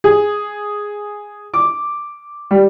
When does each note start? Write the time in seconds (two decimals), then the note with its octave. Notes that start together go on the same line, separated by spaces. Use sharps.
0.04 G#4
1.54 D6
2.51 G3